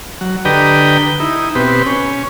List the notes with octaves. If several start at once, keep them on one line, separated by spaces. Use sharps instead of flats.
F#3
D3 G4 B4 D#5 G5 A#5
D#4 E4
B2 C4 G4 B4
C#4